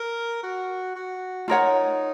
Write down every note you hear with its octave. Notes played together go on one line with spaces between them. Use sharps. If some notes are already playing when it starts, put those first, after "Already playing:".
Already playing: A#4
F#4
F#4
D#4 F4 A#4 C#5 F#5